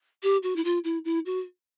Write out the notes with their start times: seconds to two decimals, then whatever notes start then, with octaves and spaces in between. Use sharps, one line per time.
0.23 G4
0.43 F#4
0.56 E4
0.64 F4
0.84 E4
1.05 E4
1.26 F#4